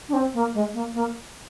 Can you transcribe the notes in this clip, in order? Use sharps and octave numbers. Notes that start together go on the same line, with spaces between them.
D4
C4
A#3
G#3
A#3
A#3